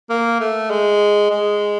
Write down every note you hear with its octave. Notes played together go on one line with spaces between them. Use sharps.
A#3
A3
G#3
G#3